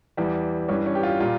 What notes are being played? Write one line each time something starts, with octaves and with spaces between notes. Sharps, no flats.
E2 E3 G3
G2 E3 G3 C#4
C#4
G4
F4
A#2 G3 F4